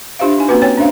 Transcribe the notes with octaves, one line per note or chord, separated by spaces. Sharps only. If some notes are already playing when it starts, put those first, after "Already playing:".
D4 F4 G4 C5 E5 F5
D4 D#4 G#5
A#3 C4 C#4 F#4 B4
C4 C#5 G5 G#5
C#4 D4 C5 E5 F5